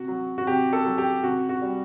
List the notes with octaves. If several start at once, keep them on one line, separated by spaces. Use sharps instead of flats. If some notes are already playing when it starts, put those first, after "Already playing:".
Already playing: C3 F#4
F#3
F#4
C3 G4
A4
F#3
G4
C3 F#4
F#4
G3